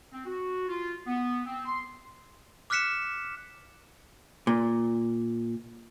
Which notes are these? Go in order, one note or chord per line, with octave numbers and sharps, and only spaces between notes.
C4
F#4
F4
B3
C4
C6
D6 F6 F#6 B6 C#7 E7
A#2